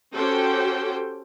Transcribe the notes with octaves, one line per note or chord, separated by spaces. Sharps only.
C#4 F#4 G4 A4 C5 G5